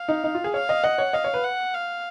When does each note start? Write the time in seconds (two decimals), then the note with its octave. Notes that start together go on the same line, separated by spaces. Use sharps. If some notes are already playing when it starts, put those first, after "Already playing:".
Already playing: F5
0.08 D#4
0.24 D#4
0.35 F4
0.44 G#4
0.54 C#5 F5
0.69 D#5
0.84 D#5 F#5
0.98 C#5
1.13 D#5 F5
1.24 C#5
1.34 B4
1.44 F#5
1.74 F5